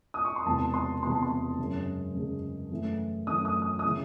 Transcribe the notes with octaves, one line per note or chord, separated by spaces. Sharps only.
D#6
C#6
C6
E1 E2 C3 A5
C6
E1 E2 C3 C6
A5
C6
F#2 C#3 G#3
F#2 C#3 G#3
F#2 E3 A3
F#2 E3 A3 D#6
D#6
D#6
D#6
C#3 E3